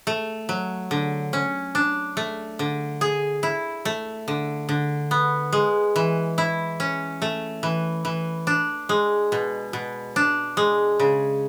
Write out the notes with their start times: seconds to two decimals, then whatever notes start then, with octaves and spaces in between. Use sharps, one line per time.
0.07 A3
0.49 F#3
0.91 D3
1.33 C#4
1.75 D4
2.17 A3
2.59 D3
3.01 G#4
3.43 E4
3.85 A3
4.28 D3
4.69 D3
5.11 B3
5.53 G#3
5.96 E3
6.38 E4
6.80 C#4
7.22 A3
7.63 E3
8.05 E3
8.47 D4
8.89 G#3
9.32 B2
9.73 B2
10.16 D4
10.57 G#3
11.00 C#3